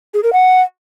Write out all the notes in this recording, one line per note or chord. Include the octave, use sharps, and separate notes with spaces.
G#4
A#4
F#5